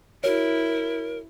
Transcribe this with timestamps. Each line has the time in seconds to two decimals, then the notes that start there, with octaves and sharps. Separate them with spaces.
0.24 E4 F#4 A#4 C#5